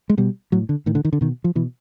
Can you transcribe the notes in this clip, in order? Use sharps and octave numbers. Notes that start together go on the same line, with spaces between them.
G#3
B2 G3
A2 F#3
D3
A2 D#3
D3
D#3
D3
B2 D#3
F3
B2 E3